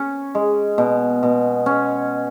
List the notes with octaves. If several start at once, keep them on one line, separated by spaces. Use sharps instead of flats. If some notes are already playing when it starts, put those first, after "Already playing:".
Already playing: C#4
G#3
B2
B2
C#4